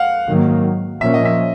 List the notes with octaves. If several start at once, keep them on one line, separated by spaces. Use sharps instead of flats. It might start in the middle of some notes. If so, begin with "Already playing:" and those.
Already playing: F5 F#5
G#2 D#3 F#3 A#3
A#2 F3 A#3 C#4 E5
D#5
E5